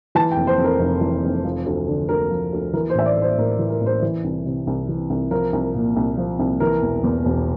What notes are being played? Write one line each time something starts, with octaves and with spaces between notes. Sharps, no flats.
E3 A5
G5
F1
C5
F2
A#4
F1
E3
F1
F3
D2
D3
D2 A#4
F3
D2
E3 A#4
C5
A1 E5
D5
A2
C5
A1 A#4
E3
A#4
A1
C5
E3
C2
C3
C2
E3
C2
F3 A#4
C2
A#2
C2
F3
C2
E3 A#4
E1
E2
E1